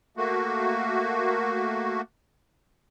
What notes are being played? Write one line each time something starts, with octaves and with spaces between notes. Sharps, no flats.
A3 A#3 F#4